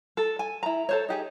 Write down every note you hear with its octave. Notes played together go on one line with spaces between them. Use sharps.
A4
G#5
E4 A#5
A4 C5 C#5
D#4 G4 G#4